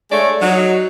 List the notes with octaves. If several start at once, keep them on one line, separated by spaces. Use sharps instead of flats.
G#3 A3 C#5 D5
F#3 D#4